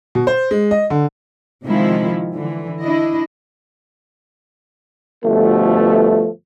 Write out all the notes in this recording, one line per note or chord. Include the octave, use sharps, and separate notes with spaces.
B2
C5
G#3
D#5
D3
C3 D#3 F3 G#3 E4
D3 E3
D4 E4 D#5
G1 B2 F3 A3